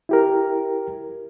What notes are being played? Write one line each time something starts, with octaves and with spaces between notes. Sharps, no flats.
E4 G4 A#4